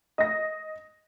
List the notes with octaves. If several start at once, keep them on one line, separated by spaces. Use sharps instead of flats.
D#5 A#6